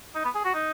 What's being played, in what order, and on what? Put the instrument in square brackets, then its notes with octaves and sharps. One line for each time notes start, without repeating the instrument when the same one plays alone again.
[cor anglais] D#4
B3
G#4
F#4
D#4